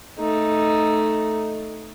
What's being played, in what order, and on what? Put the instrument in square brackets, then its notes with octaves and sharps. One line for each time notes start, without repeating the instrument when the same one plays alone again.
[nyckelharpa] A3 D#4